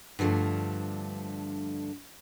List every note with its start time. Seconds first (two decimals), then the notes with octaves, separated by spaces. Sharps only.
0.19 G2 D3 F3 G3 A3